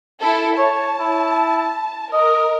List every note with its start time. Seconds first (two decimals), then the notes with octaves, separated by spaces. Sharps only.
0.21 E4 A4
0.58 C#5 A5
1.00 E4
2.13 A#4 D#5